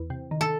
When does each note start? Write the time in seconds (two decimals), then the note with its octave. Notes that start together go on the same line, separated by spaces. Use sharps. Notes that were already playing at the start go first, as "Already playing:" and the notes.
Already playing: E2
0.10 C3
0.31 D#3
0.41 A4